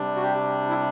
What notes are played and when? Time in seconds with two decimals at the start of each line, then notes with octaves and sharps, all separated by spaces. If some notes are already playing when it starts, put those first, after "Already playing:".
Already playing: C3 G3 D4
0.16 F#4
0.23 G4
0.69 E4